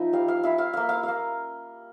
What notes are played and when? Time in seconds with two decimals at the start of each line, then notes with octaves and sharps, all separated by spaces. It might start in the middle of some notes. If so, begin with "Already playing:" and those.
Already playing: F3 C#4 D#4 E4 D#5
0.13 G3 F5
0.28 F5
0.43 E4 F5
0.58 F5
0.73 A#3 F5
0.89 F5
1.03 A#3 F5